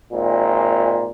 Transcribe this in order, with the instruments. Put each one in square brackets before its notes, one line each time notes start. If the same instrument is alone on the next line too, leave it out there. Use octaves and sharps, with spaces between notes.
[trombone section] G#1 A#2